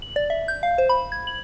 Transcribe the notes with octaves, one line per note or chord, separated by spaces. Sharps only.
F#7
D5
E5
G6
F5
C5
B5
G#6
F#7